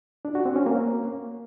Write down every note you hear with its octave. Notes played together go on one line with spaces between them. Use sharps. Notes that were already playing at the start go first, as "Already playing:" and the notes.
D4
F#4
C4
C#4
A#3